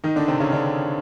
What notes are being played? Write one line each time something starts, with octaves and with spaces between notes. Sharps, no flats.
D#3 D#4
D3 D4
C3 C4
C#3 C#4
D3 D4